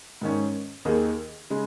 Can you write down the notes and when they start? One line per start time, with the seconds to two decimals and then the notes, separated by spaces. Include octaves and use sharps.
0.21 G#2 D#3 C#4
0.85 D#2 D#3 A#3 D#4 G#4
1.50 C#3 G#3